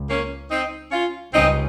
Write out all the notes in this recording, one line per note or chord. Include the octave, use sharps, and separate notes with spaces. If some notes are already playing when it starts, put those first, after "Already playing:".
Already playing: C#2
A#3 C#4
C4 D#4
C#4 F4
C#2 C#3 G3 C4 C#4 D#4